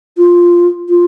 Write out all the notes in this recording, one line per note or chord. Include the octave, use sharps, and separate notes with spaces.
F4
F4